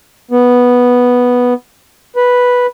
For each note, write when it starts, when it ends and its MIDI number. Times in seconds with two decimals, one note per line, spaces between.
0.31 1.54 59
2.16 2.67 71